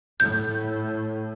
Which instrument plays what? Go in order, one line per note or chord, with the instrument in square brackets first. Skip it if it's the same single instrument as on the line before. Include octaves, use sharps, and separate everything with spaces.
[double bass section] A2 [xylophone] G6